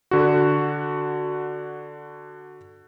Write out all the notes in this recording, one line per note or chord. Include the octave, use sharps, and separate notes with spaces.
D3 F#4